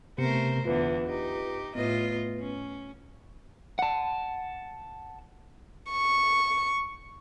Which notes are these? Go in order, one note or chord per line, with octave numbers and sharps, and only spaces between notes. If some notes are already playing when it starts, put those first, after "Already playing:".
C3 A3 B3 A#4 C5 C#7
E2 D3 F4 B4
D#4 G4
A2 B3 F4 B4 D#5
C#4
F#5 A5
C#6